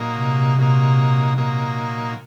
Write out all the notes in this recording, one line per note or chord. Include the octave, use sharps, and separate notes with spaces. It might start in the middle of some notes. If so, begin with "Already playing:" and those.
Already playing: A#2 F#3 A#3 D#4
C3
A#2 F#3 A#3 D#4
A#2 F#3 A#3 D#4